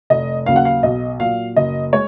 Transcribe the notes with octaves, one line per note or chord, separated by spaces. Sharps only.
F1 D#5
D#2 C#3 F#3 F5
F#5
F5
B1 D#5
A#2 F#3 F5
F#1 D#5
G#3 C#5